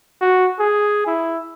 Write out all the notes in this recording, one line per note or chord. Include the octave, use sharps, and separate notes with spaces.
F#4
G#4
E4